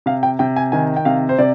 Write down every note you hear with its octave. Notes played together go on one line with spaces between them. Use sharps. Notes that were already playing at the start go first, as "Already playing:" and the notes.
C3 F5
G5
C3 G5
G#5
D#3 G#5
G5
C3 F5
C5
C3 D5